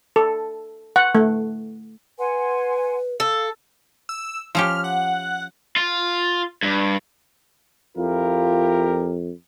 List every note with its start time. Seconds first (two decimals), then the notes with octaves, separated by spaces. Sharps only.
0.16 A4
0.96 F#5
1.15 A3
2.18 B4 F#5 G#5 C6
3.20 A4 F5
4.09 E6
4.55 F3 C#4 G4 F6
4.84 F#5
5.76 F4
6.63 G2
7.97 F2 E4 F4 G4 A#4